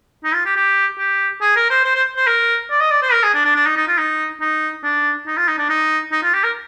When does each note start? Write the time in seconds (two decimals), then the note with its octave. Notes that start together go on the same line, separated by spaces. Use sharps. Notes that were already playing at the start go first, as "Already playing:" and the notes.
0.24 D#4
0.34 F4
0.46 G4
0.56 G4
0.99 G4
1.41 G#4
1.56 A#4
1.70 C5
1.84 C5
1.95 C5
2.16 C5
2.27 A#4
2.70 D5
2.80 D#5
2.91 D5
3.03 C5
3.12 A#4
3.23 G#4
3.34 D4
3.45 D4
3.55 D4
3.66 D#4
3.76 D#4
3.88 F4
3.98 D#4
4.41 D#4
4.83 D4
5.27 D#4
5.37 F4
5.48 D#4
5.58 D4
5.69 D#4
6.12 D#4
6.23 F4
6.33 G4
6.44 A#4